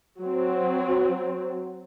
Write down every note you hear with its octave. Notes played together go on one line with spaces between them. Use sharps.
F#3 C4